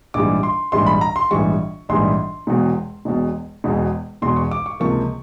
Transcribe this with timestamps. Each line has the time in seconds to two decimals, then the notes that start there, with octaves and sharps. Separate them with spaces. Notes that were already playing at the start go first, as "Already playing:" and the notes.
0.14 A#1 G#2 E3 G3 D6
0.43 C6
0.72 A#1 G#2 E3 G3 C6
0.86 B5
1.01 A#5
1.16 C6
1.31 A#1 G#2 E3 G3 C#6
1.89 A#1 G#2 E3 G3 C6
2.47 E1 E2 B2
3.05 E1 E2 B2
3.64 E1 E2 B2
4.22 E1 E2 B2 C6
4.36 C#6
4.51 D6
4.66 C#6
4.80 C#2 C3 F3 A#3 C#6